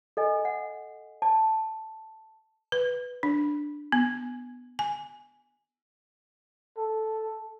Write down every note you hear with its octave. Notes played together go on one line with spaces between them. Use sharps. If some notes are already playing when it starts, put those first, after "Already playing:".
A4 D#5 G#5
F#5
A5
B4
D4
B3
G#5
A4